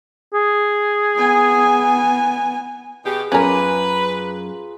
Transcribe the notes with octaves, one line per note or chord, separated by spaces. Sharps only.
G#4
B3 G#5
B2 G4 G#4
F#2 C#4 F4 A#4 B4 G#5 A#5 D6